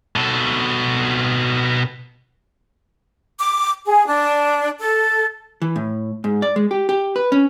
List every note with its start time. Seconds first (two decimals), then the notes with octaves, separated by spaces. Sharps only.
0.16 B2 A4
3.39 D6
3.86 G#4
4.07 D4
4.79 A4
5.62 E3
5.76 A2
6.24 G#2
6.42 D5
6.56 G#3
6.71 G4
6.89 G4
7.16 B4
7.32 C#4